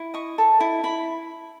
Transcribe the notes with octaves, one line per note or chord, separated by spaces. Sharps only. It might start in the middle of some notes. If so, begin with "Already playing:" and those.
Already playing: E4
D#5 C#6
A4
E4
E4 B5